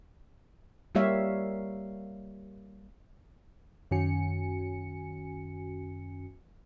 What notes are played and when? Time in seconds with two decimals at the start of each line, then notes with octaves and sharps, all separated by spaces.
0.95 G3 A#3 G4 C#5 E5 F5
3.91 F#2 D#3 C#4 F#4 G#5 C#7